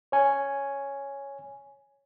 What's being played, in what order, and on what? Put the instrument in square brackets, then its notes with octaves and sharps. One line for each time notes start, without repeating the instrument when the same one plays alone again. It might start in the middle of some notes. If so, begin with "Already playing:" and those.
[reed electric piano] C#5 G#5